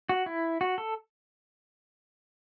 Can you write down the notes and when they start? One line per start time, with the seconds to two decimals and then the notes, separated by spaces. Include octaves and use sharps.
0.09 F#4
0.26 E4
0.61 F#4
0.78 A4